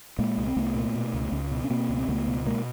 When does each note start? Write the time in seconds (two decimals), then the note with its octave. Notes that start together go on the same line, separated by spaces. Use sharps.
0.19 A#2 G#3 A#3
0.37 C2
0.47 C4
0.56 C2 A3 B3
0.75 A#2
0.95 B2
1.14 C#2
1.32 C#2
1.51 B2
1.64 C#4
1.70 B2 A#3 C4
1.89 C#2
1.97 C4
2.08 C#2 A3 B3
2.27 B2
2.46 B2 G#3 A#3